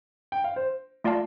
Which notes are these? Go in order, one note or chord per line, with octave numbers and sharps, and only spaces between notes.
G5
F5
C5
A3 F4 D5 F5 A5